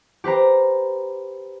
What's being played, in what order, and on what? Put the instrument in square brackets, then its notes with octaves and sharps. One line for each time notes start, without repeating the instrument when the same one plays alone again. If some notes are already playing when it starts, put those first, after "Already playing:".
[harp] G4 B4 C5 A#5